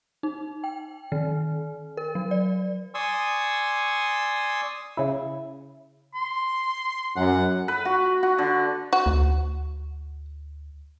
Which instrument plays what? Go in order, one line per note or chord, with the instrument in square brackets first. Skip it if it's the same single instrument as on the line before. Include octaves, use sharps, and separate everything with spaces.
[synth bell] D#4
G5
D#3
A#4
F#3
D5
[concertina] D5 G#5 C6 C#6 D#6 E6
[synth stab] C#3 E4
[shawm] C6
[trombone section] F#2 [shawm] F#5
[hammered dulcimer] B4
F#4
F#4
D3
[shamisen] F#4
[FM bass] D2